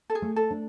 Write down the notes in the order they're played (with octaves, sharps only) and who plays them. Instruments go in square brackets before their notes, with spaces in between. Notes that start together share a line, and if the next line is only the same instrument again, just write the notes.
[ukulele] A4
G#4
[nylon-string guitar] A3
[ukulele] A4
[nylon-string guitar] D4